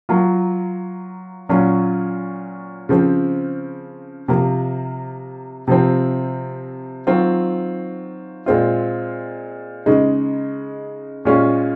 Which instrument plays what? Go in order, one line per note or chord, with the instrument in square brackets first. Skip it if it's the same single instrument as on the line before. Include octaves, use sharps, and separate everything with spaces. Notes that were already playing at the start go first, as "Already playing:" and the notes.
[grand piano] F#3 A#3 F4
A#2 F#3 C#4 F4
C#3 F3 C4
C3 F3 A#3
C3 F3 C4
D#3 F#3 C4 F4
A#2 G#3 C4 F4
C#3 G#3 D#4
A#2 G#3 C#4 F4